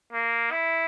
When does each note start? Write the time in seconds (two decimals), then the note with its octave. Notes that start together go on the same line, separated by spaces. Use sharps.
0.13 A#3
0.52 E4